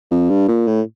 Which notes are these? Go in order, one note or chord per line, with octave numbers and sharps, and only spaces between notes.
F2
G2
A#2
A2